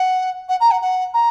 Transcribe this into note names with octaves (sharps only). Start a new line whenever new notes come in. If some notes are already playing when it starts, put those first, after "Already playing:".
Already playing: F#5
F#5
A#5
F#5
F#5
A#5